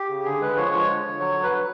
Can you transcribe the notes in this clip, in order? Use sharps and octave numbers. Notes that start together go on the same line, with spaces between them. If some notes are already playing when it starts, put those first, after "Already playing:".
Already playing: G4
C#3
D3 G#4
G#3 B4
F3 C#5
F3 C#5
D3
D3
F#3 C#5
F#3
B4
F#3